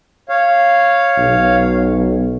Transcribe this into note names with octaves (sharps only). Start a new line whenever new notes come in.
C#5 F5
B1